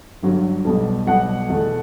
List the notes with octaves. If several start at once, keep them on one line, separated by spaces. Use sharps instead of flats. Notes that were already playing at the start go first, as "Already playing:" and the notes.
G1 G2 F#3
B1 B2 G3
B1 B2 G3 F#5
E2 B2 A3